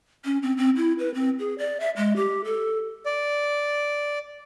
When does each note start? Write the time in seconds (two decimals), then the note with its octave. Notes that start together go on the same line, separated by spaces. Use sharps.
0.25 C#4
0.43 C4
0.57 C4
0.76 E4
0.99 B4
1.14 C4
1.39 G#4
1.58 D5
1.80 E5
1.97 G#3
2.16 G4
2.45 A4
3.06 D5